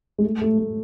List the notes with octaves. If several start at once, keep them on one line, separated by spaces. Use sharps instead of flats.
G#3
A3
A3
A3